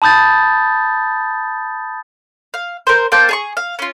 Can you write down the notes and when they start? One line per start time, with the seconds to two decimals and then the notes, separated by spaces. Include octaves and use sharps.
0.02 A5 B5 D#6 G6 A6
2.54 F5
2.87 A#4 C5
3.12 A#3 C5 G5 A5
3.29 G#4 A5 C#6
3.57 F5
3.79 C#4 F4